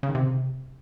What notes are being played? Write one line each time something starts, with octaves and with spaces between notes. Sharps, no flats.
C#3
D#3
C3